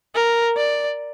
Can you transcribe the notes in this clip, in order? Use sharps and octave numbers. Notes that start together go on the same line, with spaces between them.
A#4
D5